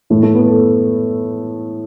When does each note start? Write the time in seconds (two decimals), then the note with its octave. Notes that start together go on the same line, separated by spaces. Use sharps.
0.10 A2 E3 A3
0.23 A3
0.35 B3
0.48 A4